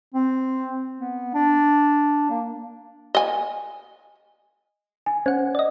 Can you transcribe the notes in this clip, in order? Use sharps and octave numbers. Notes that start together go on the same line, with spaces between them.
C4
B3
D4
A#3
D#5 G#5
G#5
C#4 C5 F#5
D5 D#5